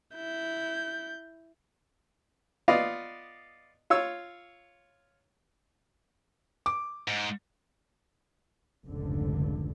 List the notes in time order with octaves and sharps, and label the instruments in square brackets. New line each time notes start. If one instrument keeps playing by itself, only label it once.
[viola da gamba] E4 [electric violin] G6
[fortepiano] B3 F4 D5 D#5 F5
F4 C#5 E6
[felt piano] D6
[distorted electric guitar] G#2
[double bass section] F1 C#2 G#2 D3